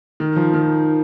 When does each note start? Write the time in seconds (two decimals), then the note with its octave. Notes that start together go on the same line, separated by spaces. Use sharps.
0.20 D#3
0.36 F3
0.53 D#3